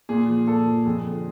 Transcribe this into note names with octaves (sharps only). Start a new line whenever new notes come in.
A#2 G#4
F3
A#2 A4
F3
F2 G#4
D3 F3